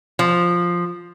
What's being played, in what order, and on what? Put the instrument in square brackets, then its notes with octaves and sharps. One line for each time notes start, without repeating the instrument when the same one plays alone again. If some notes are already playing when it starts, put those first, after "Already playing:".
[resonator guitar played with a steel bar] F3